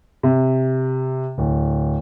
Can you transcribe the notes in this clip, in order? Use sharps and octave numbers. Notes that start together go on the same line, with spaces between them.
C3
D1